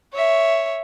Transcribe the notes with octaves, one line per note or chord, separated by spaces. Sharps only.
C#5 E5